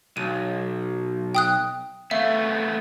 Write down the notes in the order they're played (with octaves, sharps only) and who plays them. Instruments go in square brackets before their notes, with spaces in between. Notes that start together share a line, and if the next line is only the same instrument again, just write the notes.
[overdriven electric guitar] B1 [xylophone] D#7
[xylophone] G5 D#6 F#6
[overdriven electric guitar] A3 B3 [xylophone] E5 F5